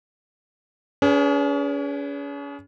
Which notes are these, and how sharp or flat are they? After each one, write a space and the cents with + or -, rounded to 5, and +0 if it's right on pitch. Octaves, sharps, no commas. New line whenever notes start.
C#4 +40 G#4 +0 B4 +0